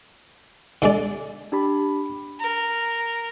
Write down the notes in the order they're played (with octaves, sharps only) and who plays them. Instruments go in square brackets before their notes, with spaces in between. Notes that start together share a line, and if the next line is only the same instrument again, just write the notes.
[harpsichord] D3 G#3 D5
[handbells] D4 G4 B5
[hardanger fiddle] A#4